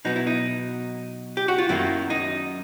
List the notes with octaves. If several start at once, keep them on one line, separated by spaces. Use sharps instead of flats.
B2 F#3 B3 D#4
E4
D#4
G4
F#4
F4
F#2 D#3 F#3 A#3 E4
D#4